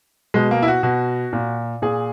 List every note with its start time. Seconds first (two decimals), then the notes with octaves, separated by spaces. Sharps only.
0.34 B2 G#3
0.51 A#3
0.62 E4
0.68 F#4
0.83 B2 F#4
1.33 A#2
1.82 A#2 G#4